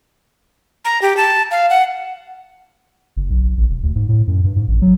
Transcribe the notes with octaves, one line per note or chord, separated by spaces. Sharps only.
A#5
G4
A5
F5
F#5
F#1
B1
A1
E1
D2
G#2
A2
F#2
G2
G#2
A1
F#3